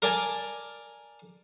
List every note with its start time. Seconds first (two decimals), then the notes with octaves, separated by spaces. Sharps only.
0.02 A#4 D5 G#5 A5